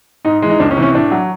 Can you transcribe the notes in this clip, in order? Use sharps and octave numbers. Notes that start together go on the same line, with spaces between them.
G#2 D#4
E3 G#3
D#4
C#2 D4
C#4
C3 E3
C#4
A2 D4
F#3